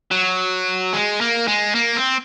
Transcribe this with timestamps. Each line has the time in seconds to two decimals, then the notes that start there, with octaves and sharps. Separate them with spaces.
0.11 F#3
0.93 G#3
1.21 A#3
1.47 G#3
1.75 A#3
1.96 C4